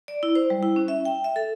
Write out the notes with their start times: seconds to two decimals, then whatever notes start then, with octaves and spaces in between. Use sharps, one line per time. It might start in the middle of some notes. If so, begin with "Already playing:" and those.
0.08 D5
0.23 E4
0.35 C5
0.50 G3
0.63 E4
0.76 C#4
0.88 E5
1.05 G5
1.24 E5
1.36 A4